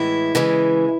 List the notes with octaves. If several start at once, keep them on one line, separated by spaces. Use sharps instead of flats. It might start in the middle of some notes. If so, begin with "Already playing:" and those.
Already playing: A2 E3 G#3 E4
C#3 E3 G#3